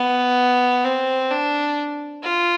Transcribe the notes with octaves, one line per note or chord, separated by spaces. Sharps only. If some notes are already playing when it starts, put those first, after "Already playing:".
Already playing: B3
C4
D4
F4